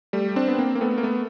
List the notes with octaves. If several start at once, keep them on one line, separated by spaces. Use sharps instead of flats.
G3 A3
C4 D4
B3
A#3 C4
A#3
A3 B3
A#3
A3 B3